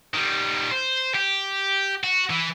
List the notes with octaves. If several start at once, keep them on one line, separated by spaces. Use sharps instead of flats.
D#3 G3
C5
G4
F#4
E3